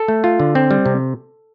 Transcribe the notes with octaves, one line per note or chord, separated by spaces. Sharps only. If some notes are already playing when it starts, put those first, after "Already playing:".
Already playing: A4
A3
F4
D3
C4
G3
C3